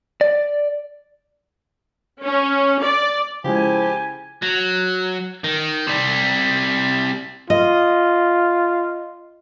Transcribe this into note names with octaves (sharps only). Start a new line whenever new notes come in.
D5
C#4
D5
C#3 F3 G#3 E4 G4 G#5
F#3
D#3
C3 G3
F4 D#5